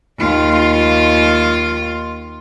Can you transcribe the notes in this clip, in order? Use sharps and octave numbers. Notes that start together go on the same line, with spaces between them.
D#2 F4